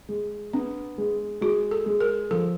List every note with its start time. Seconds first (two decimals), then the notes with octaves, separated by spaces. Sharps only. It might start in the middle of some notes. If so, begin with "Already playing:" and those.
0.09 G#3
0.53 B3 D4
0.98 G#3
1.41 G#3 F#4
1.71 A4
1.86 G#3
2.01 A#4
2.31 F3 A4